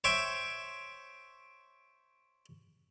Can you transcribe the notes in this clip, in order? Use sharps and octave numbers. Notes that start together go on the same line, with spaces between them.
C5 C#5 E5 G5 C#6